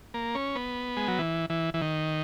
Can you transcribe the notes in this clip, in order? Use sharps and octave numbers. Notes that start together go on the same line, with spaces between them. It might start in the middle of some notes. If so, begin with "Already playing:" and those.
A#3
C#4
B3
G#3
F#3
E3
E3
E3
D#3